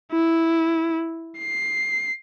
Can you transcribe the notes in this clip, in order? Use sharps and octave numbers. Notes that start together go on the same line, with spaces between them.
E4
C7